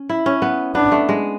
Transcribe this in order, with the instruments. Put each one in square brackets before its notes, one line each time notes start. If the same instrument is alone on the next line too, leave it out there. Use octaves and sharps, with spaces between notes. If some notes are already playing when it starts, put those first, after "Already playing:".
Already playing: [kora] C#4
E4
C#4
B3
[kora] B3 [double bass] D4
[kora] A3
G#3